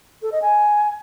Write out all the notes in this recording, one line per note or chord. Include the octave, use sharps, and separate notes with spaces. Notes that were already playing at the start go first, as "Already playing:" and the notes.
A4
D#5
G#5